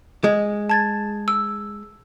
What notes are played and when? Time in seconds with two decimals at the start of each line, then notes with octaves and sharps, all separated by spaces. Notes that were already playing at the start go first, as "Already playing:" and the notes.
0.24 G#3
0.70 A5 G#6 A6
1.28 E6